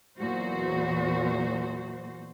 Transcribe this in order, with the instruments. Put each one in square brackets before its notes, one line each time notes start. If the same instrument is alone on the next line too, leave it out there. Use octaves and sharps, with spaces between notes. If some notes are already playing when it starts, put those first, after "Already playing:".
[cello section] E2 A#2 E3 F#3 F#4 C5